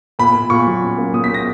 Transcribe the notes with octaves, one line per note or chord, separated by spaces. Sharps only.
A#2 B5
A#2
A#2 C#6
F#3
C#4
A#3
A#2 D#6
B6
A#3 A#6